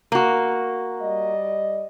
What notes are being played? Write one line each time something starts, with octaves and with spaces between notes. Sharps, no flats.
A#3 F#4
G3 D5 D#5